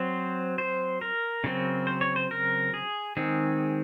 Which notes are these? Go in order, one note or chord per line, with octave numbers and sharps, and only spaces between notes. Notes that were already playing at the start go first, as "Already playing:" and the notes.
Already playing: F#3 C4 C5
C5
A#4
C#3 F#3 C4
C5
C#5
C5
A#4
G#4
D#3 G#3 C4 G#4